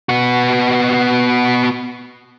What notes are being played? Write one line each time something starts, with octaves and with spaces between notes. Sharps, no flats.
B3 F#4